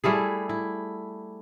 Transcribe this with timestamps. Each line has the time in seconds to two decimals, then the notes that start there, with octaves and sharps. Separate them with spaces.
0.04 G3 A3 E4 G#4
0.49 E4